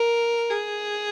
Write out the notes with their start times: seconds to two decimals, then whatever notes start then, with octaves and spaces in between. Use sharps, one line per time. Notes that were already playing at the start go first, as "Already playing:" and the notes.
Already playing: A#4
0.51 G#4